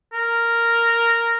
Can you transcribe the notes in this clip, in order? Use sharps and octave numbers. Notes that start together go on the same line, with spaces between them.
A#4